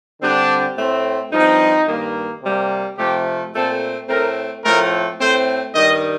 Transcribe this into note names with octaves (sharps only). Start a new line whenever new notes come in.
D3 G3 C4 D4
A2 A3 C4
G2 F3 C4 D#4
G2 D#3 A#3
C3 G3 A#3
C3 F3 A3 G4
A#2 A3 C4 A4
A2 A3 C4 A#4
A2 F3 A3 C4 A#4
A2 A3 C4 C5
G2 D#3 G3 D#5